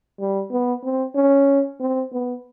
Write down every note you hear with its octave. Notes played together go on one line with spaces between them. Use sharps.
G3
B3
C4
C#4
C4
B3